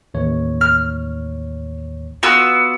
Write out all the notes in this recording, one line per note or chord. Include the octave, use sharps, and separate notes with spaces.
A1 D#2 C#5
F6
B3 F4 F#4 E6